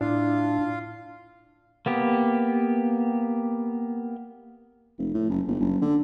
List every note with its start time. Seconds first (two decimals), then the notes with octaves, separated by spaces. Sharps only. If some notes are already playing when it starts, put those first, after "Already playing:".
0.01 A2 D4 E4 F4 F5
1.86 A#3 B3 G4
4.99 F1
5.14 A2
5.29 F#1
5.47 G1
5.60 F#1
5.82 D3